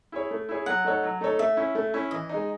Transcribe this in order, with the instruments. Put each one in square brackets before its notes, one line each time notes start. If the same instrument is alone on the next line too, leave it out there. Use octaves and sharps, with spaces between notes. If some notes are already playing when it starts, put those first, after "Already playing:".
[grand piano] E4 G#4 C#5
A3
E4 G#4 C#5
[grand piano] F#3 [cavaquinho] F#5
[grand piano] A3 D#4 A4 C#5
F#3
A3 D#4 A4 C#5
[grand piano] A3 [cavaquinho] E5
[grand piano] C#4 E4
A3
C#4 E4
[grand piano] E3 [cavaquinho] D#5
[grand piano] G#3 D#4